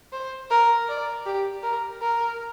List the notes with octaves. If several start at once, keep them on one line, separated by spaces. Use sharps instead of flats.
C5
A#4
D5
G4
A#4
A#4